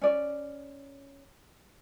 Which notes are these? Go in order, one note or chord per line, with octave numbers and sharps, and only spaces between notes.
C#4 D5